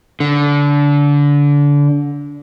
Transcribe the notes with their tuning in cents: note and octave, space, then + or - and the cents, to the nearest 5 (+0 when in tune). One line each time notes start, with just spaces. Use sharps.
D3 -25